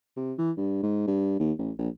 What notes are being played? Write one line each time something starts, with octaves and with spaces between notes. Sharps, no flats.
C3
E3
G2
G#2
G2
D#2
A1
A#1